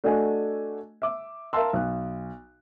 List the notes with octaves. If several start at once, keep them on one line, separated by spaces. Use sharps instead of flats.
A3 D4 F#4 A4 D#5 G#5
E5 D6
A#4 E5 F5 A5 C6 E6
B1 F#6